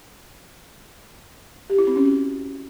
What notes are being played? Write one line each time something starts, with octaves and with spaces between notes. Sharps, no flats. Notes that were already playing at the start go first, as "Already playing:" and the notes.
G4
E4
C4
C#4
F#4